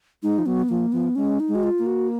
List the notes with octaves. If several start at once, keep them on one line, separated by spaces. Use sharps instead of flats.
G#3 D#4
F3
F#3 B3
F3 A#3
F3 B3
G#3 C#4
D#4
G#3
F#4
F4
A#3
F#4